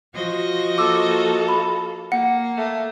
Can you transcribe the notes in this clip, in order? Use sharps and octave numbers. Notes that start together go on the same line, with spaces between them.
F3 F#4 D#5
A#3 A4 D6 E6
B5
A#3 F#5
A3